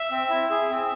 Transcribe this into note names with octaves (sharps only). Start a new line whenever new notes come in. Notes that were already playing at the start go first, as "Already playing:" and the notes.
Already playing: E5
C4
E4
G#4
C4